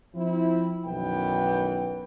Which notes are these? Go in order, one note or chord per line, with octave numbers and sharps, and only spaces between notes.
F3 C4 E4
B1 F#2 D#3 E3 B3 G5